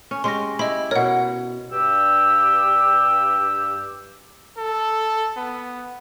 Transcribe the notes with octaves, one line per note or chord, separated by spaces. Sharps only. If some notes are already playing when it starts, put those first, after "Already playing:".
C#4
G#3 C#4 G4 C6 A#6
E4 G4 D#5 B5
B2 A#4 C#5 F#5
G2 G4 E6
A4
B3